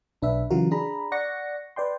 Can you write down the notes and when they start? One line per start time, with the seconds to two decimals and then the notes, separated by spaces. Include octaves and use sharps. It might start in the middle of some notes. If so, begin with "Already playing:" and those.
0.22 B1 D4 B4 E5
0.50 C#3 E3 F#3 F4 F#4 A#4
0.71 D4 G#4 A#5 B5
1.12 D5 F#5 C#6 A#6 C#7
1.76 B4 D5 G5 C6